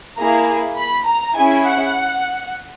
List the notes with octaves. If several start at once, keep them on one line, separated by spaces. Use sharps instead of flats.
A#3 E4 G#4 A#5
B5
A#5
C#4 E4 G#4 G#5
F#5